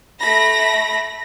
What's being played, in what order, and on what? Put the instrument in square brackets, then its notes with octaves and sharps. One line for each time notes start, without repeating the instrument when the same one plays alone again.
[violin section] A3 B5 A#6